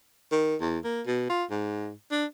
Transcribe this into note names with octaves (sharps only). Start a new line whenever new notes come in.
D#3
E2
A#3
B2
F4
G#2
D4